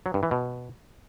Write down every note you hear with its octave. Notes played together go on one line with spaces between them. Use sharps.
F#3
G2
E3
B2